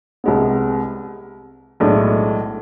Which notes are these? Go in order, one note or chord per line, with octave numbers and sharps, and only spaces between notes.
C2 C3 G#3 B3
B1 A2 G#3 D4